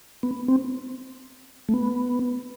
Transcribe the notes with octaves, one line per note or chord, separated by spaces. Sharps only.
B3
C4
A3
B3